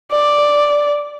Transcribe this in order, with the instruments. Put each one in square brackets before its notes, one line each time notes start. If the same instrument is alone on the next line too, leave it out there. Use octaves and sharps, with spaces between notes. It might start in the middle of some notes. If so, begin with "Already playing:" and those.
[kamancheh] D5